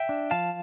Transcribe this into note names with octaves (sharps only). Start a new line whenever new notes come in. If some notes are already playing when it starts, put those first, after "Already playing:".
Already playing: E5 G5
D4
F3 F5 A5